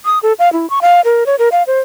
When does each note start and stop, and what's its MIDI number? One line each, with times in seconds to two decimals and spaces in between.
0.05 0.19 87
0.23 0.33 69
0.39 0.52 77
0.53 0.69 64
0.70 0.79 85
0.82 1.01 77
1.05 1.26 70
1.26 1.36 73
1.39 1.49 70
1.52 1.63 77
1.67 1.79 72